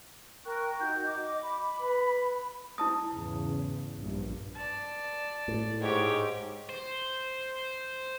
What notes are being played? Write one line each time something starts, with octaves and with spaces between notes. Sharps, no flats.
A#4 G5 C#6 F#6
D#4 F#4 D#5 G6
D#5 D6
B5
B4
E4 A5 D#6
E2 G#2 C#3
A#1 G2
D5 A5
A2
G#2 G4 C#5 D6
C5